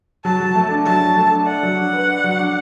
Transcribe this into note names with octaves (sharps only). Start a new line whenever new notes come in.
F#3 A5
F#3
A3
D4
F#3 A5
F#3
A3
D4
D5 F#5
F#3
D4
B4
D5
F#3
D4